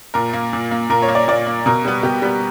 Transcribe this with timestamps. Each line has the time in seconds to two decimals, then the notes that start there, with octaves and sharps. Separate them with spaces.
0.14 A#2 A#4
0.33 A#3
0.53 A#2
0.71 A#3
0.90 A#2 A#4
1.02 C#5
1.08 A#3
1.15 D5
1.28 A#2 D5
1.47 A#3
1.66 B2 A#4
1.85 G3 B3
2.03 B2 G4
2.22 G3 B3